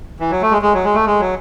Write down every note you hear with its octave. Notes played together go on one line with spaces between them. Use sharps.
E3
F#3
A3
G#3
G#3
F#3
G#3
A3
G#3
F#3